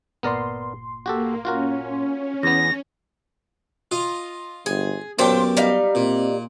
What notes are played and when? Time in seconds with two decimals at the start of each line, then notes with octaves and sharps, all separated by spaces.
0.23 G1 A#2 B3 A#4 D5 C6
1.06 A#3 F#4 G4 A4
1.45 C#4 F4 F#4 A#4
2.43 E2 B3 A#6
3.91 F4 D#5
4.66 G1 G#4
5.19 F#2 A#2 B3 G4 C5 G5 A5
5.57 G3 D#4 F5
5.95 A#2 C4